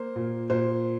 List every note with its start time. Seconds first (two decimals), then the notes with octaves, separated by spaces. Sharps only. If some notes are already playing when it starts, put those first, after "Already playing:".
Already playing: A#3 C5
0.16 A#2
0.50 A#2 C5